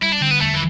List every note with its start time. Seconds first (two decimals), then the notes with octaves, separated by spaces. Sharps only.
0.02 G3 E4
0.12 D4
0.21 D3 C4
0.31 B3
0.41 E2 A3
0.54 E3